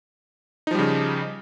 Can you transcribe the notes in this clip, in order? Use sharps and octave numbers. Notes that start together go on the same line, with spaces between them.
C#3 F3 G3 D#4